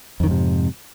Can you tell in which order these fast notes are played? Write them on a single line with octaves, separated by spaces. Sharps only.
F2 D#3 G#2 C3